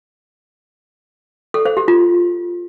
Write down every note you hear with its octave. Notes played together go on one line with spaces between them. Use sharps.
A4
C5
G4
F4